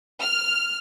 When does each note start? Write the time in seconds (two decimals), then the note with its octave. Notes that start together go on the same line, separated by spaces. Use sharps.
0.21 F6